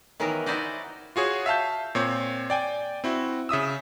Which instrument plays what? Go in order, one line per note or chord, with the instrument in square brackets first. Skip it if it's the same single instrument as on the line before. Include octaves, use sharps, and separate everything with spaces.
[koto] D#3 E3 F#3 B3 A#4
D#4 E4 F#4 C5 D5 D#5
[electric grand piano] F4 F#4 G#4 C#5
E5 F5 A5 G6
A#2 C4 C#5
D5 G5 G#5
C4 E4 F#4
C#3 E5 D#6 E6